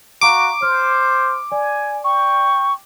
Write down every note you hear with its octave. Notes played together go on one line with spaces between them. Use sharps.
F#4 F5 A#5 C#6 D6
C5 F6
D5 G#5
G5 C#6